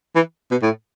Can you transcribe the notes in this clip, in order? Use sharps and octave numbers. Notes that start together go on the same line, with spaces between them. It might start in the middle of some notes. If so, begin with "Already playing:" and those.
E3
B2
A2